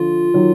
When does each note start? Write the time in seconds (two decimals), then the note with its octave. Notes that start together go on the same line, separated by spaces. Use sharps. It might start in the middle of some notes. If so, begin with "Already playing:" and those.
Already playing: D3 F3 F4
0.34 D#3 F#3